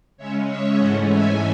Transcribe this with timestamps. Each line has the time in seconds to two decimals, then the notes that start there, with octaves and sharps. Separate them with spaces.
0.17 C#3 G#3 C#4 C#5 E5
0.46 C#5 E5
0.76 G#2 E3 A3 C#4 D#5 F#5
1.06 E5 G#5